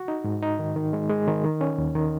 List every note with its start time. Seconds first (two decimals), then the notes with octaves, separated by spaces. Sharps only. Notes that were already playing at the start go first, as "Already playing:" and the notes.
Already playing: F#4
0.08 D#4
0.24 G#2
0.43 D#4
0.59 D#3
0.76 D#3
0.93 G#3
1.09 G#3
1.27 D#3
1.44 D#3
1.61 C#4
1.78 D#2
1.95 D#3